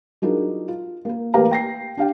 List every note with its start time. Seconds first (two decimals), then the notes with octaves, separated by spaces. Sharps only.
0.22 F#3 D4 D#4 F4 G#4 A#4
0.68 F4
1.05 A#3 A#4
1.34 A1 A#3 G4 B4 F5 A#5
1.51 G5 A#6 C7
1.97 D4 G4 F5 G5